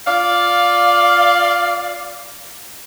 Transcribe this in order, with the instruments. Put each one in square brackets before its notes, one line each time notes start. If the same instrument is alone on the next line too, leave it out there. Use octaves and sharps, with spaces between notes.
[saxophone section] F4 D5 F5